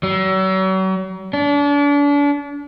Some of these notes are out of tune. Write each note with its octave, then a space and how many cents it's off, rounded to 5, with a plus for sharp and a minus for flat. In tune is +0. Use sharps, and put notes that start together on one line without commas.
F#3 +40
D4 -35